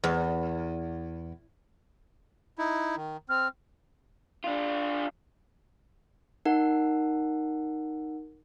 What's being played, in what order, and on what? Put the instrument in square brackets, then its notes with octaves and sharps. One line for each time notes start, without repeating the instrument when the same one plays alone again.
[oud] E2
[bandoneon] D#4 E4
D#3
[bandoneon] C4 [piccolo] F6
[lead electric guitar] D4 F4
[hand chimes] D#4 A#4 F#5